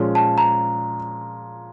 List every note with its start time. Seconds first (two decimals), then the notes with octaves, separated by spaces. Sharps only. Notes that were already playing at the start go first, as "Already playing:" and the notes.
Already playing: A#2 F3 G#3 C#4
0.15 A5
0.38 A#5